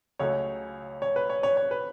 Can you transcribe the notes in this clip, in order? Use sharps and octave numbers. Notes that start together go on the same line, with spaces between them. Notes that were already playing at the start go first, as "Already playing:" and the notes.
C#2 C#3 F#3 A3 C#5
C#5
B4
C#5
C#5
C#5
B4